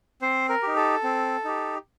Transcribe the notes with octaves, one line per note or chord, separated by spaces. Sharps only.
C4 C5
A#4
D#4 G4
A4
C4
D#4 G4